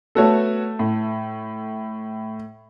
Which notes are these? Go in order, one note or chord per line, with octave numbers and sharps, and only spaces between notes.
A3 B3 F#4 A4 C#5
A2